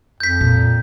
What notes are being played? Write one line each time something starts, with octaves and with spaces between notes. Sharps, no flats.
F2 G6 B6
A#2